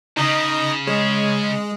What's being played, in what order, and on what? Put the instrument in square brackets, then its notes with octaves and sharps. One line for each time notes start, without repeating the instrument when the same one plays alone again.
[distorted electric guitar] C#3 [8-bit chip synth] D#4 D#5
[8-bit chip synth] G#3 [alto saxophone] C#5